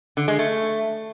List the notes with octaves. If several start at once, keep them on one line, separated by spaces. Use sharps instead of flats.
D3
G#3
A3